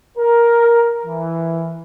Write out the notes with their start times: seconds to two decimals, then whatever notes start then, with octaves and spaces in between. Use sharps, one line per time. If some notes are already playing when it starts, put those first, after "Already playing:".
0.18 A#4
1.05 E3